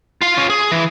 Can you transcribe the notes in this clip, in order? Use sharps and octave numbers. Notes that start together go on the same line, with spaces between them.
F4 F5
C#4 F4
G#4
E3